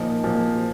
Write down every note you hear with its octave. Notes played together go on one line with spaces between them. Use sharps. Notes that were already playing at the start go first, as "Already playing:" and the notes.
Already playing: A#2 F3 D#4
A#2 F3